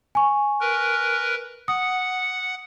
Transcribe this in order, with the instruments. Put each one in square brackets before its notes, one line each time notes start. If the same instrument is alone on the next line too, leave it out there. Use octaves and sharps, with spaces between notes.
[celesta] G#5 C#6
[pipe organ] A#4 B4
[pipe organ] F#5 [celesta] D#6